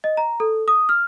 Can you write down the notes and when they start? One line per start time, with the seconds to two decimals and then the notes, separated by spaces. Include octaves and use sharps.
0.04 D#5
0.17 A#5
0.40 A4
0.68 D#6
0.89 F6